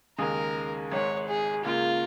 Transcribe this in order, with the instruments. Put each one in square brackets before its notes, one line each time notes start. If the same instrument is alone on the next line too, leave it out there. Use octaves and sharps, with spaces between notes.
[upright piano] D#2 C#3 G#3 D#4 G#4 [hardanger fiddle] A#4
[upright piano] G#1 G#2 G#3 [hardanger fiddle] C#5
[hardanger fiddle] G#4
[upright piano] C#2 C#3 A#3 [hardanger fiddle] F4